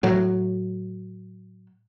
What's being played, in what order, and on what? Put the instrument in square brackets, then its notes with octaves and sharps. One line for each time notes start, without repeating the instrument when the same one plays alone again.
[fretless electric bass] A2 F#3